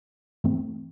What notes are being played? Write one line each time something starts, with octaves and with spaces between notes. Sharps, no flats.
G2 E3 A3 C4